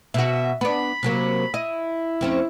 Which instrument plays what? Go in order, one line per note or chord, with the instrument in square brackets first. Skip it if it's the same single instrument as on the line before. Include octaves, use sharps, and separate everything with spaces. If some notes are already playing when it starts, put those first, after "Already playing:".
[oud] B2 F#4 [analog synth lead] E5
[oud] B3 D4 [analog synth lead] B5
[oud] C3 F#3 A#3
[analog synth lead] E4 [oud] D#5
[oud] F2 C4 C#4